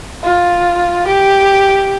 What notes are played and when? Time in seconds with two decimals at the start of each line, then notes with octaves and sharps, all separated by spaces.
0.23 F4
1.07 G4